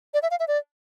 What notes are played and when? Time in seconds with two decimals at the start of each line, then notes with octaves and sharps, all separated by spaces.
0.14 D5
0.22 E5
0.31 F5
0.40 E5
0.48 D5